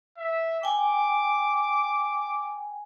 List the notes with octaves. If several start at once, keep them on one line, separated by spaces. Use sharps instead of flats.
E5
G5 G#5 D6